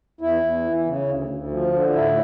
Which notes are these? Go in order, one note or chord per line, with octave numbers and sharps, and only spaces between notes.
E2 E4
E2
E3
C#3
D2
D2
F3
D3
A2 E4